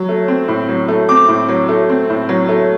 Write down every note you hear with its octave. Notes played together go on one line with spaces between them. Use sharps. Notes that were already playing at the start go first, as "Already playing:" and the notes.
Already playing: F#3
A3
C4
A2
F#3
A3
C4 D6
A2
F#3
A3
C4
A2
F#3
A3